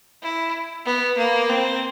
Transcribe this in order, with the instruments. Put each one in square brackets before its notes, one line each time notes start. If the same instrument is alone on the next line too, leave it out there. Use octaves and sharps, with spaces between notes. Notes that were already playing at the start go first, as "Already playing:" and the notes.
[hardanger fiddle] E4
B3
A#3
C4